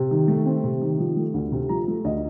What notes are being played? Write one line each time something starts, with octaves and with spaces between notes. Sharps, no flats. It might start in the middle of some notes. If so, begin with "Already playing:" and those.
Already playing: C3
D#3
A3
C4
C3
D#3
F3
A3
D2
C3
F3 A#5
A3
D2 D#5